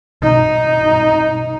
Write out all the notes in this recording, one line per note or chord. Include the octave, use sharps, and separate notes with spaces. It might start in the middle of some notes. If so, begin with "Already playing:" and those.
D#4